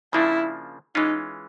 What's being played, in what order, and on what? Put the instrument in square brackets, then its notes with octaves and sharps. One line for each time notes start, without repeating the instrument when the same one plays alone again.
[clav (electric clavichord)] C#3 F3 A#3 D4 [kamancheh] E4
[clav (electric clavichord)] E3 G#3 C#4 F4 [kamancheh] D#4